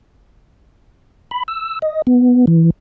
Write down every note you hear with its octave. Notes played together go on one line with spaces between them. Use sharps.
B5
E6
D#5
B3
E3